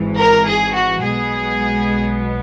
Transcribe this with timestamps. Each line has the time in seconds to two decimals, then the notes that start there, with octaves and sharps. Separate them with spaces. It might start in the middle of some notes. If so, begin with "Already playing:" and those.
Already playing: G#1 G#2 E3
0.18 A#4
0.45 G#4
0.73 F#4
1.02 B1 B2 G#3 B3 G#4